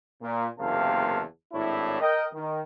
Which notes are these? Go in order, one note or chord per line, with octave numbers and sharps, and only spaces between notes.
A#2
F#1 E2 C3 A#3 F5 A5
G#1 A2 D4 E4 C#5
A#4 D#5 G5
D#3